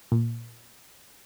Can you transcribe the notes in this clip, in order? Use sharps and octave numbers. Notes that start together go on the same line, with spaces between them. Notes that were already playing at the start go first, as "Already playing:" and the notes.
A#2